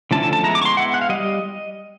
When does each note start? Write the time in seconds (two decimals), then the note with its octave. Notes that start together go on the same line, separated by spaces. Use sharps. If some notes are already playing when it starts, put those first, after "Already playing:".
0.11 D3 F3 A3 C#4 E4 A5
0.23 A5
0.33 A5
0.44 G#3 B3 E4 A#5
0.55 D6
0.61 C#6
0.65 C6
0.77 G#3 B3 E4 F#5
0.94 F#5
1.02 F5
1.09 G3 D#5